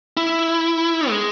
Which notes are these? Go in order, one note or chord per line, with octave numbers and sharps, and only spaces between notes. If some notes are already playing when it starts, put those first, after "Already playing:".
E4
G#3